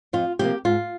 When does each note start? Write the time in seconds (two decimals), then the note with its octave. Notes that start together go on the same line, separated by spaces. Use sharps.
0.13 F2 F4
0.39 C3 F3 A#3 G4
0.65 G#2 F4